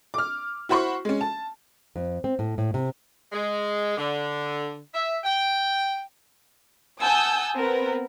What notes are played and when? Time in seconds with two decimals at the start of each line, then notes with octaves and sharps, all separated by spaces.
0.14 D6 F6
0.69 E4 F#4 C5 B5 C#6
1.05 G#3 C#4
1.21 A5
1.96 F2
2.24 C4
2.39 A2
2.58 A2
2.74 C3
3.32 G#3
3.97 D3
4.94 E5
5.24 G5
7.00 F#5 G#5 A5 D#6 E6 G6
7.58 B3 C4 A#4 B4